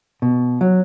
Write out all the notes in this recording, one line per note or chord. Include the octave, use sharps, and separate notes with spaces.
B2
F#3